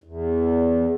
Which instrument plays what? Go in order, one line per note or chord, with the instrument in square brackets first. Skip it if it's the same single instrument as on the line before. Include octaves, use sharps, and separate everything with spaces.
[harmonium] E2